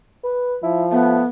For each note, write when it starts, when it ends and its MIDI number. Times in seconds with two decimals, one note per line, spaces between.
0.24 0.57 71
0.63 1.21 53
0.63 0.85 64
0.92 1.23 57
0.92 1.25 59